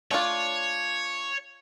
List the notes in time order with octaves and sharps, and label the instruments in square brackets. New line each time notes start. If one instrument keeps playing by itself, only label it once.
[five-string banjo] A3 D4 F4 [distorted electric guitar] C#5